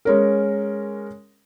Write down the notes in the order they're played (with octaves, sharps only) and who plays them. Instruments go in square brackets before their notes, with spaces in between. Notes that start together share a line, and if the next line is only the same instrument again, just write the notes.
[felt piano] G#3 C#4 A#4